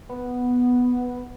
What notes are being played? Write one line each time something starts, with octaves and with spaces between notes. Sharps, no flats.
B3